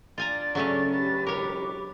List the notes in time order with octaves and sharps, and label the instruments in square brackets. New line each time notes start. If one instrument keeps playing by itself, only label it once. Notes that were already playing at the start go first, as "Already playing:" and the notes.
[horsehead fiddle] D4 D5 [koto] F4 G#5 A#5 [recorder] A6
[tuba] C#3 [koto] F#3 A3 C#4
[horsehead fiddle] G4 B4 [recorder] A6
[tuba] E1 [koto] A#4 C#5 [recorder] D6